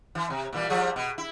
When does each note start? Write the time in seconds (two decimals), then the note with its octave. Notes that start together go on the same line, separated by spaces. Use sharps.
0.15 E3
0.30 C3
0.53 A#2 E3 G3
0.70 F3 G3 G#4
0.96 B2
1.18 E4